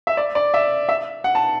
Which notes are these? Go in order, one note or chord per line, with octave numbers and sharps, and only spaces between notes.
E5
D5
D5
E5
E5
F#5
A5